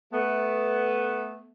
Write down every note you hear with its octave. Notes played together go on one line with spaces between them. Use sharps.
A3 B3